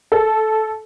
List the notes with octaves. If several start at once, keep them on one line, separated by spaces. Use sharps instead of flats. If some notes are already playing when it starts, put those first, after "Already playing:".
A4